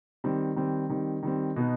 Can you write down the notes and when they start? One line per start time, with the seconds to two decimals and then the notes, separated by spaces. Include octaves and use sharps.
0.24 D#3 G3 C4
0.56 D#3 G3 C4
0.90 D#3 G3 C4
1.23 D#3 G3 C4
1.56 B2 B3 D#4